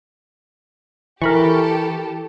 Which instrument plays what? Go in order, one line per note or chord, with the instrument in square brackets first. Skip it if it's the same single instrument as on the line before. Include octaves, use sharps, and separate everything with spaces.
[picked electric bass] E3 [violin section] G4 A4 [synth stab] A#4 B5 C#6